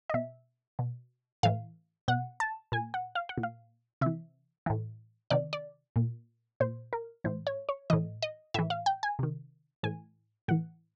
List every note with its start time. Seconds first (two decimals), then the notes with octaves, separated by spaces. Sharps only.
0.10 D#5
0.14 B2 E5
0.79 B2
1.43 A2 E3 F5
2.08 B2 F#5
2.40 A5
2.72 A#2 G#5
2.94 F#5
3.15 F5
3.29 F#5
3.38 A#2
3.43 F5
4.01 C3 E3 E5
4.66 A2 E3
5.30 C3 D#3 D5
5.53 D5
5.96 A#2
6.60 A#2 C5
6.93 A#4
7.24 A2 E3 C5
7.47 C#5
7.69 C#5
7.90 A2 E3 D#5
8.23 D#5
8.54 A2 E3 E5
8.70 F5
8.86 G5
9.03 G#5
9.19 C3 D#3
9.83 A2 E3 G#5
10.48 A2 E3 F#5